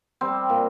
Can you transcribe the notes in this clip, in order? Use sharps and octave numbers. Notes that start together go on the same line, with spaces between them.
G3 C4
A#2